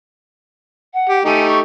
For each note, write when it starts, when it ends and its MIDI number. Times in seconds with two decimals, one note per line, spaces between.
0.93 1.19 78
1.09 1.21 67
1.25 1.60 57
1.25 1.60 63
1.25 1.60 67
1.25 1.45 80
1.48 1.59 85